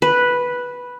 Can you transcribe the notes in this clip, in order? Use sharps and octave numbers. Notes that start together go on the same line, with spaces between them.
B4